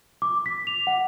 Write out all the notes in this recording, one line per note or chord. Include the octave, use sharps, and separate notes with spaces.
D6
B6
F7
F#5